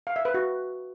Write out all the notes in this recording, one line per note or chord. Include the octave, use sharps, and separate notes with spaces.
F5
E5
B4
F#4